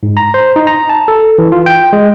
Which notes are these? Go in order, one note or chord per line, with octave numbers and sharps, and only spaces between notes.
G#2
A#5
C5
D#4
A#5
A5
A4
E3
F4
G5
G#3